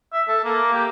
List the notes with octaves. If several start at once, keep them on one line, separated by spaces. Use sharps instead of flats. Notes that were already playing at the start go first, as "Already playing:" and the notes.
E5
A4
A#3
G4